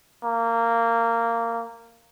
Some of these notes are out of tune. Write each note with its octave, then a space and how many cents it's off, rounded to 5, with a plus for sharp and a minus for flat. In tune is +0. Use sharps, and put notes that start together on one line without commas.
A#3 -15